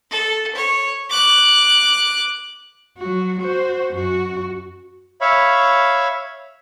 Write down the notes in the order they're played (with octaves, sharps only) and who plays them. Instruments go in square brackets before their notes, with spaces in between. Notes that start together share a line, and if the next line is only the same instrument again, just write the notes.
[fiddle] A4
C#5
D6 F#6
[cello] F#3 F#4
F#4 C5
F#2 F#4
[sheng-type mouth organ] C#5 E5 F5 B5 C#6